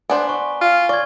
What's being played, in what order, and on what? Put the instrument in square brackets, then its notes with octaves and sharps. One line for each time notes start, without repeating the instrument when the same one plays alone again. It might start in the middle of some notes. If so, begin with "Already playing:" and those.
[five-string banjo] B3 D4 C5 [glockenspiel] G#5
[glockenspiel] C#6
[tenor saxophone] F4
[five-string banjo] D5 [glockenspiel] C#6 G#6